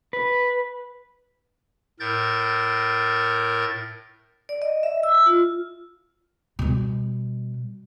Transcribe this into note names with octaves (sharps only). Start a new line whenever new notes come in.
B4
A2 A#4 G6 A6
D5
D#5
E5
E6
F4
B2 G3